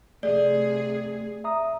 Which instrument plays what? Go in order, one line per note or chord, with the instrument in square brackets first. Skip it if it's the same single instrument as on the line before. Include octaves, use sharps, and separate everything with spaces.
[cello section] C3 G#4 [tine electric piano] A3 [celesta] D5
[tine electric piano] E5 A#5 D#6